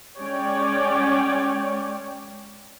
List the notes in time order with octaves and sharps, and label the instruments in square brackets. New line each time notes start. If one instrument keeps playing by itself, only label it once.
[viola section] G#3 C#4 C#5 D5 G5